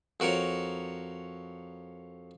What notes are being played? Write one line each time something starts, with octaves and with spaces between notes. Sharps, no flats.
F2 F#4 A#4 C#5 A#5